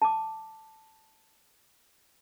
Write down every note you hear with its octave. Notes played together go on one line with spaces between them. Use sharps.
A5 D6